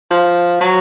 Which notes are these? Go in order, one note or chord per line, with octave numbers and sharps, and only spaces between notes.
F3
F#3